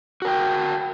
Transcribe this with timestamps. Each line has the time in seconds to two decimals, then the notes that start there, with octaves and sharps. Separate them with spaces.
0.22 F#4
0.25 A#4
0.27 G5